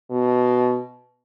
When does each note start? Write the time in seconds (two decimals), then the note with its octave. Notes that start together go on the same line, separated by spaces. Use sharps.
0.10 B2